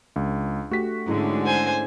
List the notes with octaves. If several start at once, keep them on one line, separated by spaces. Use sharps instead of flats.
C#2 D4
A3 F#4 G4 B6
G#2 D3 C#4 E4 G#4
C5 G#5